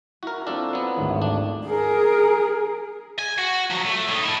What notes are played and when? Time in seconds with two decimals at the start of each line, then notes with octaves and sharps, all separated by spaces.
0.23 E4 F#4 A#4
0.47 C4 D4 F4 A4
0.73 F#3 B3
0.96 G#1 D2 G#2
1.22 D4
1.66 G#4 A#4
3.19 G#5
3.38 F#4
3.70 F3 F#3
3.86 A3
4.08 A2 D#4
4.24 A3 E4